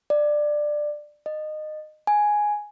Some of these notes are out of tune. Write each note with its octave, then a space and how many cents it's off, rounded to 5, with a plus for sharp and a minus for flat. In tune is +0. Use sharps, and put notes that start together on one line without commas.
D5 +15
D#5 -20
G#5 +5